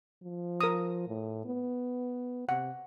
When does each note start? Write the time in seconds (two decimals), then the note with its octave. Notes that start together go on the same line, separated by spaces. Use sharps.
0.23 F3
0.61 A#4 D#6
1.08 A2
1.45 B3
2.49 C3 F#5